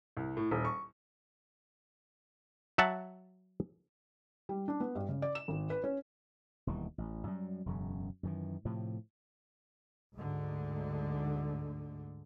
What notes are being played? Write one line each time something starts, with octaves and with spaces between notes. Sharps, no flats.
C2
A2
D#1
C#6
F#3 E5 F#5 A5
G3
D4
B3
G2
C#3
D5
E7
G#1
B4
C#4
E1 D#2 E3 G3
A1
F#2 G3
E1 F#2 C#3
F#2 D#3 E3
A2 C3 F3
D2 G#2 D3